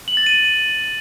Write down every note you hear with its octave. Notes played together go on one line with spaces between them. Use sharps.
F#7
A6
D#7